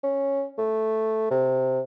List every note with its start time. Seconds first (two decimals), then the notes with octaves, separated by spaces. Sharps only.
0.04 C#4
0.58 A3
1.31 C3